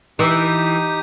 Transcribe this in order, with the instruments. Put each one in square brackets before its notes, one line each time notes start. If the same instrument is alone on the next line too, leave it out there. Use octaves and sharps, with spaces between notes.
[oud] E3 [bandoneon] D#4 G4 D#6